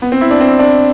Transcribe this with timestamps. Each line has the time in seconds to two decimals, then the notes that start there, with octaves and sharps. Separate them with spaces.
0.02 B3
0.12 C4
0.21 E4
0.31 D4
0.41 C4
0.59 D4